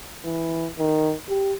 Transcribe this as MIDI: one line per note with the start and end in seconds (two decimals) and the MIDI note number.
0.25 0.67 52
0.78 1.14 51
1.29 1.54 67